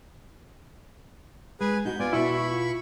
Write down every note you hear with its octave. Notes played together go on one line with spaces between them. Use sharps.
G#3 G#4 B4 G#5
D#4 F#4 A#4 G6
B3 F4 D5 G#5
B2 E4 F#4 E5 B5 C#6
F4